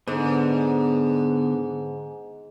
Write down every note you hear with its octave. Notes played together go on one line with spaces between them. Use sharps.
G#2 D3 B3